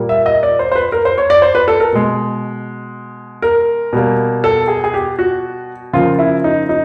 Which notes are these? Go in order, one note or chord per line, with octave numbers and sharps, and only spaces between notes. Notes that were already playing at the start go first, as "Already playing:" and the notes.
Already playing: A#2 G3 A#3
E5
D#5
D5
C5
C5
B4
A#4
C5
C#5
D5
C5
B4
A4
A#4
B2 G#3
A#4
B2 G3 A#3
A4
G#4
G#4
G4
F#4
C#3 F3 A#3 F4
E4
D#4
D#4